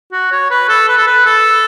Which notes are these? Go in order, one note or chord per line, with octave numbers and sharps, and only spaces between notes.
F#4
C#5
B4
A4
B4
A4
B4
A4